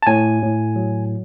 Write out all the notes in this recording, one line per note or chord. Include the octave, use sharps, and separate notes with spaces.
A5
A2 G#5
A2
F#3